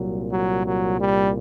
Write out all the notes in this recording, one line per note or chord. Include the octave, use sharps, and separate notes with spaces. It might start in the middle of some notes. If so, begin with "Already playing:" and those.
Already playing: C2 A#2 F#3
F#3
F#3
G3